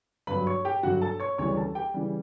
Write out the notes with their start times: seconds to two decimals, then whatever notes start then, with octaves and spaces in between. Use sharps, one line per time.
0.27 G2 D3 F#3 B4 B5
0.47 C#5 C#6
0.65 G4 G5
0.83 G2 D3 F#3 F#4 F#5
1.02 A4 A5
1.20 C#5 C#6
1.38 D2 C#3 E3 G3 C#5 C#6
1.57 A4 A5
1.75 G4 G5
1.94 C#3 E3 G3